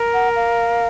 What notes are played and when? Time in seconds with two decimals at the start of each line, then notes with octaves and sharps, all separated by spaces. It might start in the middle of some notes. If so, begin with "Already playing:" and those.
Already playing: A#4
0.14 F#5
0.36 F5